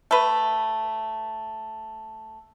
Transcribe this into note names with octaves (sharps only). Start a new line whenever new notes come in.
A3 B4